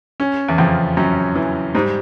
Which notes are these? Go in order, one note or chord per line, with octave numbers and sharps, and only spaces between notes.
C#4
E2
F2 C#3
F#2 C#4
E3
G#2 G3